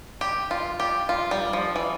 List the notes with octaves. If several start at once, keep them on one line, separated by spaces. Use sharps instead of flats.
G4
F4
G4
F4
G3
F3
E3